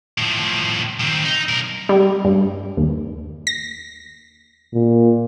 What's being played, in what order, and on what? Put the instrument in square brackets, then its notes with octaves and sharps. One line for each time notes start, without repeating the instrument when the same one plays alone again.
[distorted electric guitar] A2 F3
D#3 C4
D#4
B1 A#4
[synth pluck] G3
G2
D#2
A#6
[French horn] A#2